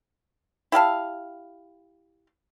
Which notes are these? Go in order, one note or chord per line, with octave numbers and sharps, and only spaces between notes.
E4 G4 F5 A5